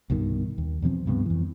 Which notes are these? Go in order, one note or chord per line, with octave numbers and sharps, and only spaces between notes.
C2 G2 B2 D#3
D#2
E2 B2 F3 C4
C#2 G2 C3 B3
F2 E3